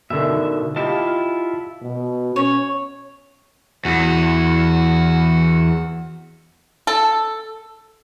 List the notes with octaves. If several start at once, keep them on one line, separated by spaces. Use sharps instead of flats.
B2 D3 D#3 E5
E4 F4 G4 D#5 A5
B2
C#4 C#5
E2 F#4
A4